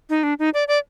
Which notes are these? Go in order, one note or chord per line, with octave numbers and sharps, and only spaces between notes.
D#4
D4
D#4
D5
D5